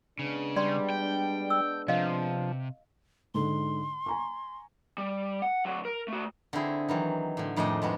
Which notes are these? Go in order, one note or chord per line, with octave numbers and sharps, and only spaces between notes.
C#3 G#3 B3 D4
G3 D5 C6
G5
E6
C3 F3 D#5 F5
G#2 D3 C6
G#5 A#5 C#6
G3
F#5
D2 F#3
A#4
A3 F#4
D3 C4 E4 G#4
D#3 E3 F#3
A2 D3
F2 A2 D#3 G#3 D4 D#5
F2 G#3 B3 F#4